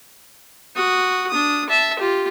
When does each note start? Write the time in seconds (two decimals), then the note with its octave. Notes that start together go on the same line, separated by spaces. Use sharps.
0.76 F#4 D#6
1.30 D4 D#6
1.69 E5 A5
1.99 F4 G4